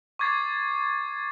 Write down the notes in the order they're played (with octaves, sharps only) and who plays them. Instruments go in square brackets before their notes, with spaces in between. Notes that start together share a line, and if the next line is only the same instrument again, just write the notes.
[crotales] C#6 D6 G#6 A6 C7